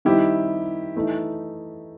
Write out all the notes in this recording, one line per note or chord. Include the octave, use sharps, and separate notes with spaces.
D#3 G3 C4 D#4 E4 G4
E3 A3 D#4